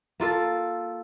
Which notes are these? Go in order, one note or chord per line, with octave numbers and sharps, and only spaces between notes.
A#3 F4 A4 A#4